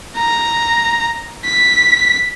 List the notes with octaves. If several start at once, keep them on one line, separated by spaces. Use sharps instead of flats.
A#5
B6